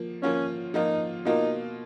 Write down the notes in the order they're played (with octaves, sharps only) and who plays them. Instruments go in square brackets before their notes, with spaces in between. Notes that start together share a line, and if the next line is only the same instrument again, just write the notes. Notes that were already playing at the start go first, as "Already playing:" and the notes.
Already playing: [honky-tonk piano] F3 A#3
[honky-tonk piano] F3 A#3 F4 [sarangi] C#4
[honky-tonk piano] F3 A#3 F4 [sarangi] D#4
[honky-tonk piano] B2 A#3 F4 [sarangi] D#4